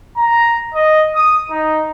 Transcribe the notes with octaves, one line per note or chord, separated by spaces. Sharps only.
A#5
D#5
D#6
D#4